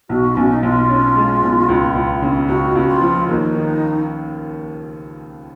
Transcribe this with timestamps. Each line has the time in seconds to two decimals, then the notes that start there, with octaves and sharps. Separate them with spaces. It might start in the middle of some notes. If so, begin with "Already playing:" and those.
0.09 B1 F#4
0.36 B1 C#4
0.50 D#4
0.63 B1 F4
0.89 C#4
1.16 G#3
1.43 B1
1.69 C#2
1.95 C#2
2.22 C#3
2.48 C#2 F#4
2.75 C#2
2.88 F4
3.01 F3
3.28 D#2 D#4
3.54 D#3